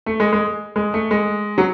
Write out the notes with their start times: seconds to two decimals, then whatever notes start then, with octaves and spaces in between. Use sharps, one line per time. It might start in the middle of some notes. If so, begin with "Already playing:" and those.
0.06 A3
0.20 G#3
0.33 G#3
0.76 G#3
0.94 A3
1.11 G#3
1.58 F#3